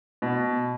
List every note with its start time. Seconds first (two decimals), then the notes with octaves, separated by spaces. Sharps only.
0.22 B2